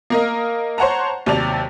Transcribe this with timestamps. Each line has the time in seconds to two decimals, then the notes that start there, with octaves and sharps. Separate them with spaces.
0.10 A#3 A#4 D#5
0.78 C5 C#5 F#5 A5 A#5
1.26 D#2 C3 F#3 D5 A5 F7